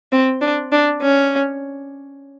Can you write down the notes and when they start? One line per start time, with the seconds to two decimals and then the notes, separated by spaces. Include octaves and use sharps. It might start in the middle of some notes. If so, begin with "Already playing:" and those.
0.12 C4
0.41 D4
0.72 D4
1.02 C#4